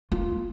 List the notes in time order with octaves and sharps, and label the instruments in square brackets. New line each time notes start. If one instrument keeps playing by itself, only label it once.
[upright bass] F4